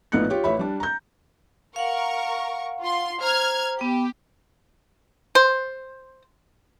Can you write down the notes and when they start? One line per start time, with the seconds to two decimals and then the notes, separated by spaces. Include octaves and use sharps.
0.12 A#1 A2 B3 D#4 F#6 C#7
0.30 F4 G4 C#5
0.44 A1 C#5 E5 B5
0.59 G3 D4
0.80 A#5 G6
1.76 A#4 F5 F#5 C#6
2.81 F4 C6
3.21 C5 A#5 F6 G#6
3.79 B3 G4 G5
5.35 C5